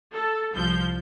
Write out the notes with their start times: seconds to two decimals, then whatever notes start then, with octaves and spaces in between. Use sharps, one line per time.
0.13 A4
0.54 C2 F3 G6